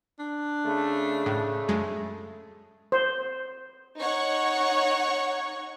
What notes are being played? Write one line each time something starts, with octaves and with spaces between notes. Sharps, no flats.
D4
C#3 A3
A2 A3
F#2 G#3
C5
D#4 C#5 F#5 C#6